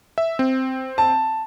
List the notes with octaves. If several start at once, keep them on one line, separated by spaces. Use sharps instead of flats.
E5
C4
A5